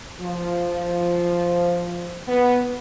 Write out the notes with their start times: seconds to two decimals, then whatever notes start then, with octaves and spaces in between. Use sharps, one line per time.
0.20 F3
2.28 B3